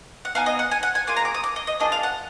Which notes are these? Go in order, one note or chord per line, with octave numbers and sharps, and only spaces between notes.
F#5
B3 D#4 G#4 F5
D#5
F#5
G#5
F#5
G#5
A#3 F4 G#4 G#5
A#5
D6
D#6
D6
D#5
D#5
A#3 D4 F4 G#4 D#5
F5
F#5